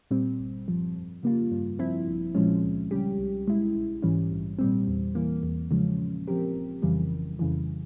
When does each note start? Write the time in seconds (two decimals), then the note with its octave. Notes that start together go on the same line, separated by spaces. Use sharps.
0.11 A#2 G3 C4
0.39 G1
0.67 G2 F3
0.95 F2
1.23 C#3 G3 A#3 F4
1.52 G2
1.79 F3 C4 E4
2.08 A#1
2.35 A#2 F3 G#3 C#4
2.63 C#2
2.91 C#3 G3 C#4 G4
3.19 C2
3.48 A#2 G#3 E4
3.75 A#1
4.02 G#2 E3 G3 C#4
4.31 A#1
4.59 A#2 G3 C4
4.87 E2
5.15 E3 A#3
5.43 E2
5.71 C#3 F3 G#3 C#4
5.99 A#2
6.28 F3 C4 G4 A#4
6.56 G1
6.82 F2 C#3 E3 G3
7.10 G1
7.39 F2 C#3 E3